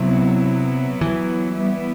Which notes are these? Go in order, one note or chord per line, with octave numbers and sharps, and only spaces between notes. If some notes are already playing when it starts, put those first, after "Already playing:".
Already playing: C3 F#3 B3 E4
E3
G3 B3 E4